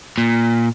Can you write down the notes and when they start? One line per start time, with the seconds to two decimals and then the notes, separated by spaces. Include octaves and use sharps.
0.18 A#2